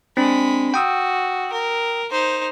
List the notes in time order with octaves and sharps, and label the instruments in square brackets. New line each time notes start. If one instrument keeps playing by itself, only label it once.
[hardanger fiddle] G#3 B5 [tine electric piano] C4 D4
[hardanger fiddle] F#4 [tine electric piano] G5 D#6 E6
[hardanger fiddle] A#4
D#4 C5